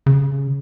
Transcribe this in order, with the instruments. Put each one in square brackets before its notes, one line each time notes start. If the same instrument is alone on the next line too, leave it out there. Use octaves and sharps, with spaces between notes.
[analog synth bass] C#3